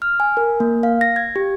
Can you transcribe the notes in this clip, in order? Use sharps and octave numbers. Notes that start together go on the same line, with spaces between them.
F6
G#5
A#4
A#3
F5
A#6
G#6
G4